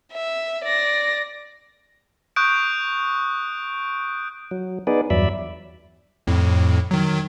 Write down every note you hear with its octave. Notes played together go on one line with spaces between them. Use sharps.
E5
D5 A#6
C#6 D#6 F#6 G6 D7
F#3
B3 D#4 G#4 B4 D5
E2 G2 F#3 D5 E5 B5
F2 A2
D#3 F#3